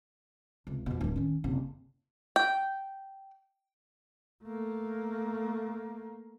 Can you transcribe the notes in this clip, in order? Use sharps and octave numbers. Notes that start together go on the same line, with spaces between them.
C#2 C3
F2 B2
D1 G3
D#3 C#4
F#1 C3
G5
A3 A#3